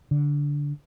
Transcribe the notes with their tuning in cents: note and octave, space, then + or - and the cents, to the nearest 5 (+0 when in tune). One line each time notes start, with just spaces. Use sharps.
D3 -15